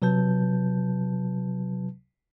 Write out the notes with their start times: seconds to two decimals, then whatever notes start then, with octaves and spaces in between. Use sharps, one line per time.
0.02 C3 F#3 B4 A5 G6